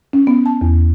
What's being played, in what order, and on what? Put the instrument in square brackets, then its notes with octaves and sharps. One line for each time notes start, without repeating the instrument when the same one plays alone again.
[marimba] C#4
B3
A5
E2